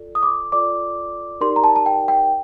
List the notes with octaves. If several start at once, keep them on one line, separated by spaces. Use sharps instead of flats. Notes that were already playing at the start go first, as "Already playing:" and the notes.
Already playing: F4 A4 D5
D#6
D6
F4 A4 D5 D6
D#4 G4 A#4 D5 C6
A#5
A5
A5
G5
G5